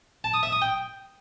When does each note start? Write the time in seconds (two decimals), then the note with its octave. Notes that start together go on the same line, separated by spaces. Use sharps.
0.24 A5
0.34 D#6
0.43 E5
0.52 D#6
0.62 G5